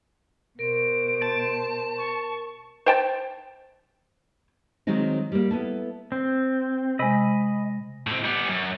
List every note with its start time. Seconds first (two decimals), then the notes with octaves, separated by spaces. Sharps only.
0.59 B2 A#4 C5 D7
1.22 A5
1.98 C#6
2.86 C5 G5 A5
4.87 D#3 F#3 G#3 C4 D#4
5.32 G3 A#3
5.51 B3 E4 A4
6.12 C4
6.99 C3 G#3 D#5 B5
8.07 A2 C4
8.25 G3 B3
8.50 F#2